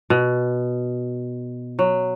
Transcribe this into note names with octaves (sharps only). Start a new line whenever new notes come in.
B2
F#3